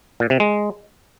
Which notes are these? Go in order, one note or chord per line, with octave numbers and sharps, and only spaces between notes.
A#2
C3
G#3